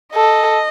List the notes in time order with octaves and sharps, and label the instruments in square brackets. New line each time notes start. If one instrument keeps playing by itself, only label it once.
[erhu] A4 [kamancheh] D#5